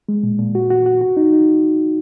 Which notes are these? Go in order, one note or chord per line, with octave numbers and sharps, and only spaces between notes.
G#3
A#2
A#2
F#4
F#4
F#4
F#4
D#4
D#4